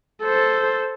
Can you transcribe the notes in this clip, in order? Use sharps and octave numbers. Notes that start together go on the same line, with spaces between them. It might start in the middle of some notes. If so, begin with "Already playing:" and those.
A4 C5